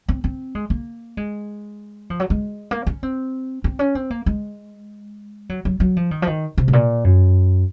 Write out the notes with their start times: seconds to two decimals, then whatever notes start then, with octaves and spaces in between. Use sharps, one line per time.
0.08 C4
0.24 C4
0.55 G#3
0.70 A#3
1.17 G#3
2.10 F3
2.20 F#3
2.30 G#3
2.71 A#3
2.87 C#4
3.03 C4
3.64 C4
3.79 C#4
3.95 C4
4.10 A#3
4.26 G#3
5.49 F#3
5.65 F#3
5.80 F#3
5.97 F3
6.11 D#3
6.22 F3
6.27 D#3
6.58 C3
6.68 G#2
6.73 A#2
7.04 F#2